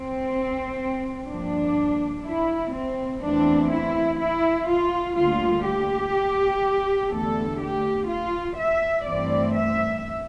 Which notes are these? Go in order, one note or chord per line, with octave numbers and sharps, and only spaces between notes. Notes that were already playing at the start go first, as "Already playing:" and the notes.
Already playing: C4
G2 F3 A#3 D4
E4
C4
E2 E3 A3 C4 D4
E4
E4
F4
D2 D3 G3 A#3 F4
G4
E2 D3 A3 A4
G4
F4
E5
G2 E3 A3 C4 D5
E5